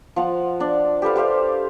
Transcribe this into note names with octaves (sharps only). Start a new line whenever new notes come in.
F3 F5 F#5
D4 D5
G4 A4 B4 F5
G4 C5 E5 F5